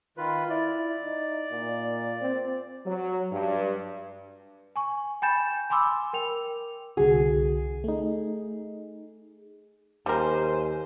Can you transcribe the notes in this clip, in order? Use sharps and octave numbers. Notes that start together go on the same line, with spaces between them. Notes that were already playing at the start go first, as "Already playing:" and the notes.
D#3 F4 B4
E4 D5
D#4
A#2
C4
F#3
G2
G#5 C#6
G5 G#5 B5 G6 A6 E7
G#5 B5 C6 D6 E6
A#4 G5 F7
C2 D3 F#4 G#4
A3 D#4
D#2 G3 A#4 C5 G#5